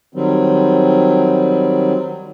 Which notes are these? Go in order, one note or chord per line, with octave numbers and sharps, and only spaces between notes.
D#3 F#3 G3 C4